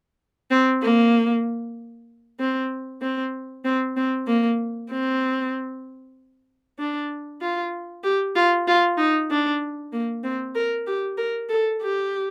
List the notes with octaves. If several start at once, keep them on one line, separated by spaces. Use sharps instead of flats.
C4
A#3
C4
C4
C4
C4
A#3
C4
D4
F4
G4
F4
F4
D#4
D4
A#3
C4
A#4
G4
A#4
A4
G4